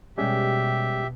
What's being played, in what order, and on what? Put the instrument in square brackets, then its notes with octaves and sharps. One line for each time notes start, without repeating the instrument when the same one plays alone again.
[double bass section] B2 [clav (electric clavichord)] G3 G#3 C#4 [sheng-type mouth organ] G4 E5